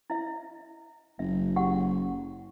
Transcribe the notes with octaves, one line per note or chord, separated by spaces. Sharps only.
E4 E5
F#1 E5
G4 F#5